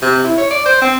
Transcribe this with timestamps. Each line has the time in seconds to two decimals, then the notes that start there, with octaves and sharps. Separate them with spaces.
0.02 C3
0.24 E4
0.37 C#5
0.51 D5
0.66 C5
0.81 C4